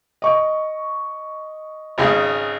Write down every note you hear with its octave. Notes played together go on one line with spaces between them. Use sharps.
D#5 C#6
G#1 C#3